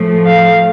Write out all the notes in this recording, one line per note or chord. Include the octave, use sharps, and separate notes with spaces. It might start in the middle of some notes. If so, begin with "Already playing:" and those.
Already playing: A2 F3 A3
F5